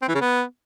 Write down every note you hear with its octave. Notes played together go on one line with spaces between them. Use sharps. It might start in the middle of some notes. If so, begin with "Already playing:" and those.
C4
E3
C#3
B3